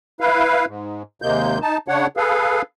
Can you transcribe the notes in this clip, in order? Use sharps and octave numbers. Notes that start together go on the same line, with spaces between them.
E4 B4 F5
G#2
D#2 C3 G#3 A#3 G6
D#4 A5
C#3 D4 C#5 F#5
G#4 A4 B4 F5